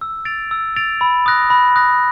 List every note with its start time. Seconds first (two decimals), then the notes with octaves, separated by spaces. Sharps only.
0.01 E6
0.25 A6 D7 F7
0.51 E6
0.76 A6 D7 F7
1.01 B5
1.26 D#6 F#6 A#6
1.50 B5
1.76 D#6 F#6 A#6